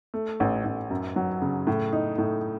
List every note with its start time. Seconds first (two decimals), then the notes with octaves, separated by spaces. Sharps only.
0.14 A3
0.40 A1
0.65 A1
0.90 F#2
1.16 F#3
1.42 C#3
1.67 A2
1.92 D#4
2.18 A2